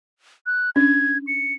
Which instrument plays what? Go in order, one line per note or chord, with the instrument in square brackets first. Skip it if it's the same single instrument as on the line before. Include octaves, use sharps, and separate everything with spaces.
[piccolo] F#6
[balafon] C#4 D4 [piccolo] G#6
[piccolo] C#7